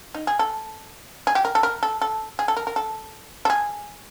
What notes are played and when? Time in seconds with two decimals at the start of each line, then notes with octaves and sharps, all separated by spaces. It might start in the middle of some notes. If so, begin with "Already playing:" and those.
0.15 D#4
0.27 G#4
0.39 A4
1.27 G#4
1.35 G4
1.45 A#4
1.55 A4
1.63 A#4
1.83 A4
2.01 A4
2.39 G#4
2.48 A4
2.57 A#4
2.67 A#4
2.76 A4
3.45 A4
3.50 G#4